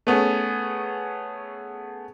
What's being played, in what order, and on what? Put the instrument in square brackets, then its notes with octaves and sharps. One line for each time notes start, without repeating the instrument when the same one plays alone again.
[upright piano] A3 B3 C#4 G#4